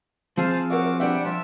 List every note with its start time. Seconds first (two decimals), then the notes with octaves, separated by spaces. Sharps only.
0.38 F3 C4 G#4 C5 F5 A5
0.70 F#4 A#4 C#5 E5 D6
1.00 G3 D4 E5 F#5 G5
1.24 F3 E5 A5 E6